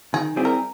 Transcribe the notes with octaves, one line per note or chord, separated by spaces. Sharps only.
D#3 G#4
G3 C4 E4 G#4
A#4